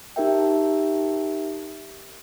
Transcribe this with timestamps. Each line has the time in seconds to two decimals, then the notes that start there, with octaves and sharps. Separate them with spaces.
0.16 D#4 G4 A#4 E5 G5